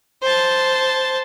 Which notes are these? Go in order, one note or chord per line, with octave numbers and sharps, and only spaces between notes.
C5 A5